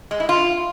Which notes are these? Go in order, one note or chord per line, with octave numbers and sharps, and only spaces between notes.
G#3
E4
F4